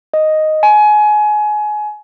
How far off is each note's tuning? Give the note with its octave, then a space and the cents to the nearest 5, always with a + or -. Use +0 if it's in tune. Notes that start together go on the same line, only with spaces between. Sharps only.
D#5 +0
G#5 +25